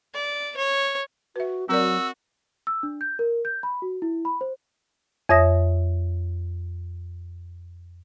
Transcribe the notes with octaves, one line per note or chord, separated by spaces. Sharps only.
D5
C#5
F#4 B4 E5
F#3 C4 F#4 A#4 D5 E6
E6
D4
G6
A#4
G6
B5
F#4
E4
B5
C5
F2 C#5 E5 D#6 A#6